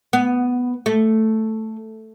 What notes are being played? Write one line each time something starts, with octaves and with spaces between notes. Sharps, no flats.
B3
A3